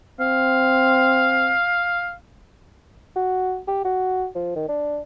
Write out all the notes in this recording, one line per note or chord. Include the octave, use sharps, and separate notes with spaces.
C4 F5
F#4
G4
F#4
F3
D#3
D4